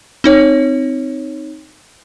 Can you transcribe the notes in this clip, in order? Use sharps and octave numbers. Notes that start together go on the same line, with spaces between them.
C4 D#4 C#5